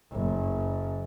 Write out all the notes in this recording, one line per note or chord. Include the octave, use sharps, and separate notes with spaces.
F#1